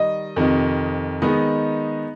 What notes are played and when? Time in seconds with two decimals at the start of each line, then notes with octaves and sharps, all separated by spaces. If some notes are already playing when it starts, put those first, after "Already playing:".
Already playing: D#3 G3 D#5
0.36 F2 C3 D#3
1.22 D#3 G#3 B3 D#4 D#5